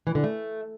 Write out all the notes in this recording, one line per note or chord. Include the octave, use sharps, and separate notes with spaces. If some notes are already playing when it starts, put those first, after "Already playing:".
E3
D3
A3